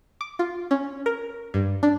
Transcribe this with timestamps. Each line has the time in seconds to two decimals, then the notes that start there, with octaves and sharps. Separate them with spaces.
0.21 D6
0.39 F4
0.71 C#4
1.06 A#4
1.54 G2
1.83 D4